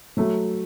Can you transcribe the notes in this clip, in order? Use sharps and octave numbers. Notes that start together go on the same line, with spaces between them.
F#3 A3